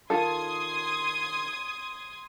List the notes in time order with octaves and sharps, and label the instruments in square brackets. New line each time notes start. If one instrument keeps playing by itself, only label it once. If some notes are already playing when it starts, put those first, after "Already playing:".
[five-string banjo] D#3 F4 A4 [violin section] C6 D#6 G#6